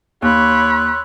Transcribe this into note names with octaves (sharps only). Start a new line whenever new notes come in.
D#2 C#5 B5 C6 E6 F#6